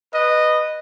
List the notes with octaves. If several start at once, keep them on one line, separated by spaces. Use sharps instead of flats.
B4 D#5